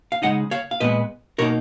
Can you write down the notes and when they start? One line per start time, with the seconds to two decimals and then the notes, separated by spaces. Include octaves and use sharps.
0.12 F5
0.22 C#3 G#3 D#4 D#5 F#5
0.51 C#5 F5
0.71 F5
0.80 A#2 G#3 B3 B4 D#5
1.38 B2 A#3 D#4 A#4 C#5